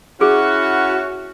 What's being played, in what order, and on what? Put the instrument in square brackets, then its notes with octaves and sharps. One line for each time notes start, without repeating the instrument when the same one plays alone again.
[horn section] C#4 E4 F#4 [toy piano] G#4